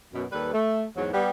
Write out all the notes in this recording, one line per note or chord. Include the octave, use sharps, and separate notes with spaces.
F#2 B2
D#2 G3 A4 B4
A3
E2 G#2 F#3
G3 B3